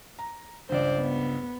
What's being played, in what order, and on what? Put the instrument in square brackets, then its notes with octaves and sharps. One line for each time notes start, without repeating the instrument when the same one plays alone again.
[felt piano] A#5
[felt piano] C#2 G2 [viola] C5 D5
[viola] B3